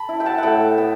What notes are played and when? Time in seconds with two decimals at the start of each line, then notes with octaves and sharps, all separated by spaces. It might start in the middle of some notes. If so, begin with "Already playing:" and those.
Already playing: A5 B5
0.09 E4
0.20 G5
0.26 F#5 A5
0.38 A2 E5 F#5 G5
0.78 B3